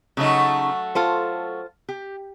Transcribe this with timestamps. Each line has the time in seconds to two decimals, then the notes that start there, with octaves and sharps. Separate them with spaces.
0.17 C#3 F#3 A3 C#4 D#4
0.95 F4 A4 C5
1.89 G4